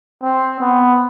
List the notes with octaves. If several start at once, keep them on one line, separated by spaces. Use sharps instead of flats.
C4
B3